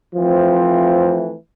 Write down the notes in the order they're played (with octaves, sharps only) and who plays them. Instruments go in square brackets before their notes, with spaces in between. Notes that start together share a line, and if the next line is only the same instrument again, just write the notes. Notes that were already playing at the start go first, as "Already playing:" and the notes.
[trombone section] E3 F3 A3 C4